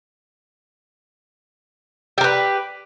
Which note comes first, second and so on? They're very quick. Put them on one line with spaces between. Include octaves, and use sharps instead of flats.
G4 A#4 B4